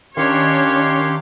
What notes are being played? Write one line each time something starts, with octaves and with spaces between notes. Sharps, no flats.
D#3 C#4 D4 G4 C#5 F5 C6